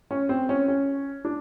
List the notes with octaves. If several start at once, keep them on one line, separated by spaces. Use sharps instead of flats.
C#4
C4
C#4
C#4
D4